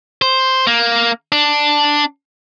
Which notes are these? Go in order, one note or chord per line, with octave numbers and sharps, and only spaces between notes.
C5
A#3
D4